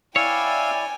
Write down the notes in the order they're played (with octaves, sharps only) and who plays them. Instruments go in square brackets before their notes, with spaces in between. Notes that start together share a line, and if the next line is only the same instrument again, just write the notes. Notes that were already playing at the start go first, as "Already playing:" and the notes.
[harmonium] E4 D5 [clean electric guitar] C#5 [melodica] F5 E6 [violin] G5 G#5